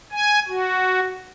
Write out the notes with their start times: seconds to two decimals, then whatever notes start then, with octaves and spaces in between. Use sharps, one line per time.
0.12 G#5
0.48 F#4